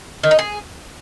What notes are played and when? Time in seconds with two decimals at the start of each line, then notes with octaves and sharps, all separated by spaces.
0.23 D#3
0.31 D#4
0.39 G#4